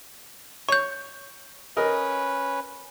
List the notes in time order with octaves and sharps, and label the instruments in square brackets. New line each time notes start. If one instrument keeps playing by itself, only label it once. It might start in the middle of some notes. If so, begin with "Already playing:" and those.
[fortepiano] C#5 [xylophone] C#6 G6
[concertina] C#4 B4 [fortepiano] A#4 D#5